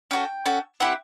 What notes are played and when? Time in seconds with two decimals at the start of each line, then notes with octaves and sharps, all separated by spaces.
0.11 C#4 F#4 A4 G5
0.46 C#4 F#4 A4
0.80 C4 E4 G4 F#5